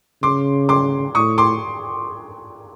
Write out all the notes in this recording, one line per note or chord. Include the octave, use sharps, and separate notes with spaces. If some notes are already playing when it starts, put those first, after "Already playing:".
C#3 C6 D6
C6 D6
A2 C#6 D#6
C6 D6